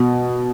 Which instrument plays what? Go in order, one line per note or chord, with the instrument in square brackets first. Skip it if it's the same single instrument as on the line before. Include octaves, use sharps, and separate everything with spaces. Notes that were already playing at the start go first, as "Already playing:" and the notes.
Already playing: [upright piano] B2